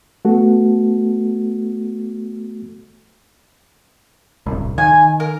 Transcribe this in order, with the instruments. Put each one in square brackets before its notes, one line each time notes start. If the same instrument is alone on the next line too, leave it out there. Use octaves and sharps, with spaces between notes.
[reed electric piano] A3 B3 F#4 A4
[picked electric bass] D1 C2
[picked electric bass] D#3 [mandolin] G#5
[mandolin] A#4